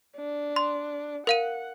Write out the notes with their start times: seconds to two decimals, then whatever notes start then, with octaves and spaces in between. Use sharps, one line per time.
0.17 D4
0.56 C6
1.27 A#4 F5 F#5 D#7